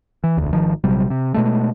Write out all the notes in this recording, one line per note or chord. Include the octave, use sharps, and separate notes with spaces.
E3
E1 D2
G#1 D#3 F3
A#1 C3 F#3 G3
C3
B2 G#3 A3